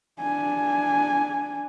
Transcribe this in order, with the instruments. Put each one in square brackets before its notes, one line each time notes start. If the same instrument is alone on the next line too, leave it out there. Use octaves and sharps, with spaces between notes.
[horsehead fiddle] D4 G#5